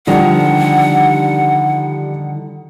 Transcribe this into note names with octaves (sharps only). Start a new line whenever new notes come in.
D3 D#3 F3 G3 F#5